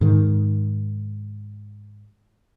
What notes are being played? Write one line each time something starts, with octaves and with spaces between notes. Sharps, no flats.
G#2 D#3